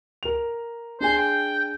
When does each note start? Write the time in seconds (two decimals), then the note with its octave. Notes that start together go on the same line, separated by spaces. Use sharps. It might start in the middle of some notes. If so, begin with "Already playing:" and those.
0.23 A#4 F7
1.01 D4 G#4 C5 G#5
1.17 G5